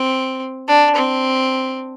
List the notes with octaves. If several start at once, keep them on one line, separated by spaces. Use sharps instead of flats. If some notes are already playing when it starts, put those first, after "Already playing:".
Already playing: C4
D4
C4